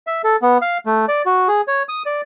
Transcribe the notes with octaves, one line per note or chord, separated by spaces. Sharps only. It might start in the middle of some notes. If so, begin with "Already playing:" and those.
E5
A4
B3
F5
A3
D5
F#4
G#4
C#5
D#6
D5